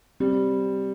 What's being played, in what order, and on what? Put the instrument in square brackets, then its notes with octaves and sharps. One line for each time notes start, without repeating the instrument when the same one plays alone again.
[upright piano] G3 [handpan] C4